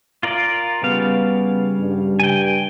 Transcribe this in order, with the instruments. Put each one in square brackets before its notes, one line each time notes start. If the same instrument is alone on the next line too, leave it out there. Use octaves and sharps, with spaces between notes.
[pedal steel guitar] F4 A#4 D5
[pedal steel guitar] C#3 G3 F5 [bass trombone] B3
[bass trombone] G2
[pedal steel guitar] G5 G#5